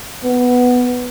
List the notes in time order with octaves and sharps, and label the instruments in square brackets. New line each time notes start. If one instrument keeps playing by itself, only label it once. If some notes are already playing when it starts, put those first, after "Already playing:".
[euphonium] B3